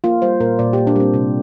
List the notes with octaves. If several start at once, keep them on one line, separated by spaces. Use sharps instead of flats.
A#3 F4
G3 C5
A#2 A#4
A#2 D5
A#3 G4
D4
G3 C4
C3